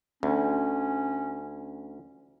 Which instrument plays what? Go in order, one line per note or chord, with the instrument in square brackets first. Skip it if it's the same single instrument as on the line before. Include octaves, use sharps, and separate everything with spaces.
[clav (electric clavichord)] D2 [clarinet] C#4